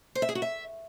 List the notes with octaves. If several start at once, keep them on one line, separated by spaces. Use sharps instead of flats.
C5
E5
G#4
F#4
E5